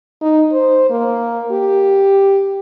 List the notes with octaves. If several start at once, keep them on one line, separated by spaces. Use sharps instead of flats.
D#4
C5
A#3
G4